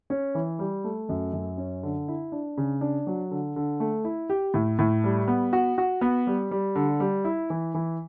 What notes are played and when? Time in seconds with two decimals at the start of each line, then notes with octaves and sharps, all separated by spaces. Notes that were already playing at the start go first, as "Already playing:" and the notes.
0.10 C#4
0.35 E3
0.59 G3
0.84 A3
1.09 F#2
1.33 F#2
1.58 C#4
1.83 D3
2.08 E4
2.32 D4
2.57 C#3
2.81 D4
3.07 F#3
3.31 D3
3.56 D3
3.80 A3
4.04 E4
4.30 G4
4.54 A2
4.79 A2
5.04 G3
5.28 B3
5.53 F#4
5.78 F#4
6.01 B3
6.27 G3
6.51 G3
6.75 D3
7.00 G3
7.25 E4
7.50 E3
7.74 E3